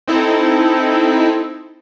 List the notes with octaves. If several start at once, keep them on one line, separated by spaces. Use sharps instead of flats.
C4 D#4 E4 A4